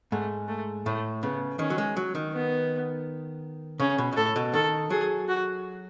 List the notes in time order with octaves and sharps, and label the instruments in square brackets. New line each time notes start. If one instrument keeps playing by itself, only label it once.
[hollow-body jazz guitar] G#2 [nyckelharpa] A3
[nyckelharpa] A3
[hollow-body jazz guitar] A2 [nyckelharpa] A3
[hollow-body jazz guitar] C#3 [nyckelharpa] B3
[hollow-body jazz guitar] D#3 [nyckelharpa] C#4
[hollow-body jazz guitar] F#3
G#3
F#3
D#3
[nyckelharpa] B3
[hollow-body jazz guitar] C#3 [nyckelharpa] C#4
[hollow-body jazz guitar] B2
B2
[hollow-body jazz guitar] A2 [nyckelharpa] A4
[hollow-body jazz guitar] B2
[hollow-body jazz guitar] D#3 [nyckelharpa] A4
[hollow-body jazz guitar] F#3 [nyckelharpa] G#4
[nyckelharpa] F#4